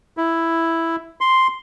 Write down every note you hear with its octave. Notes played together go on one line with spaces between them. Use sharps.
E4
C6